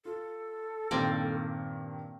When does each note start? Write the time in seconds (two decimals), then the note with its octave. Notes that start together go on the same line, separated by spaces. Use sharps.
0.05 F4 A4
0.91 G2 A#2 D#3 A#3 C4 D5